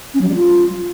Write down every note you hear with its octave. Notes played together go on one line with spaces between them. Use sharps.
C#4
F#3
G3
F4